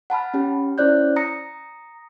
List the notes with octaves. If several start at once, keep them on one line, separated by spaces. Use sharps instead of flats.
F#5 A5 B5 F6
C#4 G4
C#4 E4 C5 D5 F#6 G6
A#5 D#6 A#6 C#7